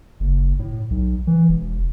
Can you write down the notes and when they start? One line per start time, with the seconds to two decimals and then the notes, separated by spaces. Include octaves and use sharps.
0.20 F#1
0.59 A2
0.90 B1
1.27 E3
1.49 E1